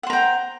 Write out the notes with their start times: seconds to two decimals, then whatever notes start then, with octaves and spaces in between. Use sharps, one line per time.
0.03 F#5
0.07 C5
0.10 A#5
0.13 G5